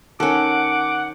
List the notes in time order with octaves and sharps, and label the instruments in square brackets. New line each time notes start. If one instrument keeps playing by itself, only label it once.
[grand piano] D#3 [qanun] C#4 A4 [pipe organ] F#5 [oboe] D6